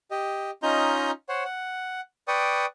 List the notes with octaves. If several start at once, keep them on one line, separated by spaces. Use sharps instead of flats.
G4 D#5
C#4 D#4 F4 D#5 A#5 G6
C5 C#5 F#5
F#5
B4 D5 G5 C#6 D#6